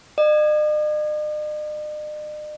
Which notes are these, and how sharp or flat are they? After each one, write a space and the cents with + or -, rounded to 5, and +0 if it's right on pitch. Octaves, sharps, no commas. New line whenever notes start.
D#5 -45